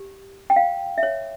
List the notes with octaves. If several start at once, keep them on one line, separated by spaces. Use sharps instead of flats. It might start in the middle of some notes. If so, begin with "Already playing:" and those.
Already playing: G4
G5
F5
E5
C#5